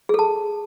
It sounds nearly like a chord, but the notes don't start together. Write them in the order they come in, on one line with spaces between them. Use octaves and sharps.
G#4 A4 A5